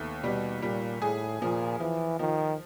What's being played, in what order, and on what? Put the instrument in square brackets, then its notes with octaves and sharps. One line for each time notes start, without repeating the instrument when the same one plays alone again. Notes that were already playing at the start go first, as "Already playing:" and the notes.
Already playing: [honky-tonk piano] D#2 A3 B3
[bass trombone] B2 [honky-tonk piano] G3
[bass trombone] A#2 [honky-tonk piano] G3
[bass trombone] A2 [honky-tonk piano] G#4
[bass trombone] A#2 [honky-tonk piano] F3
[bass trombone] E3 [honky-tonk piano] F3
[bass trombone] D#3 [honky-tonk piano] F3